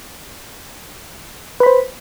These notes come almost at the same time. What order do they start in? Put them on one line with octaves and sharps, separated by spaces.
B4 B5 C5